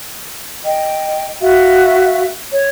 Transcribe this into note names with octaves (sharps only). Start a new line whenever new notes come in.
D#5 G5
F#4 E5 F5
C#5